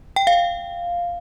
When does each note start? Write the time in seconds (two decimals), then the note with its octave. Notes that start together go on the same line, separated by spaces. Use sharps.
0.16 G5
0.27 F5